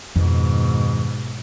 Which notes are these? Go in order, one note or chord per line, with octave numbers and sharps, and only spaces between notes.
F2 G#2 B2 D#3